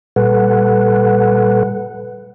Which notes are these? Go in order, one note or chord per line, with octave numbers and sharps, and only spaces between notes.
A#2 G3 A4 B4 F#5